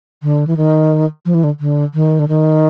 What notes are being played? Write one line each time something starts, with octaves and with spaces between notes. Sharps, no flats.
D3
E3
D#3
F3
E3
D3
D3
D#3
D3
D#3